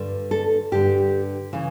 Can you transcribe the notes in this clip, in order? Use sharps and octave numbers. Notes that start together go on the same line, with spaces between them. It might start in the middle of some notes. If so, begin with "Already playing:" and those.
Already playing: G2 D3
A4
G2 D3 G4
C#3 E3